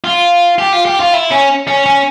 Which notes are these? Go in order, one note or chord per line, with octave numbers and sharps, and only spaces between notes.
F4
G4
F4
G4
F4
E4
C#4
C#4
C#4